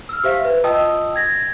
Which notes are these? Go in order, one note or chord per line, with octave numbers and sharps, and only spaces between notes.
E6 F6
G4 C5 E5 F5
B4
F4 D#5 G5 A5 D#6 E6
G#6 A#6